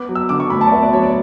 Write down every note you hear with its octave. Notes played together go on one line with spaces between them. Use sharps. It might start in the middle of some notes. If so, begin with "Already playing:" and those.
Already playing: B3 D6
F#3
E6
D3 D6
C#6
D2 B5
A5
D5
B3 E5
D5
F#3 C#5
D5